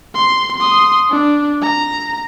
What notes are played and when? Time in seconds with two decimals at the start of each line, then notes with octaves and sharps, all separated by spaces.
0.14 C6
0.58 C6 D#6
1.10 D4
1.62 A#5